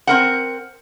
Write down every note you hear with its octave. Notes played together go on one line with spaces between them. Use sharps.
C4 A#4 F#5